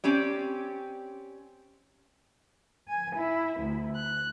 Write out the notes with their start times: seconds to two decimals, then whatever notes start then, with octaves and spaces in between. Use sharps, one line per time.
0.04 C4 C#4 G4 D5
2.88 G#5
3.16 E4
3.60 D2
3.97 F#6